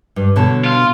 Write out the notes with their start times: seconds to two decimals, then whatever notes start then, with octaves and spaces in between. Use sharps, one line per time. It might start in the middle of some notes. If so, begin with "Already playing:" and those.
0.16 G2
0.36 B2 D3 C#5 A5
0.64 F4